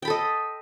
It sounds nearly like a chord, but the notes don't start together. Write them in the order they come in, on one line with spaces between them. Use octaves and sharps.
G5 B5 A4 D#5